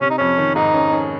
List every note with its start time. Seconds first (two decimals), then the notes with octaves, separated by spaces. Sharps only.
0.01 C3 C#4
0.10 D#4
0.18 F2 C#4
0.38 D#3
0.55 G#2 D#4
0.74 C#4
0.93 C#4